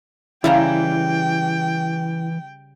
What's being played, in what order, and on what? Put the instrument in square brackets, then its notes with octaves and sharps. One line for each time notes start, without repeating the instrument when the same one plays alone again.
[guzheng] C#3 G3 A#5 [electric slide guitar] E3 G#5 [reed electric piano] E4 [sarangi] G5